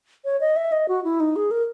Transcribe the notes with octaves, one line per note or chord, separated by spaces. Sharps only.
C#5
D#5
E5
D#5
F#4
E4
D#4
G#4
A#4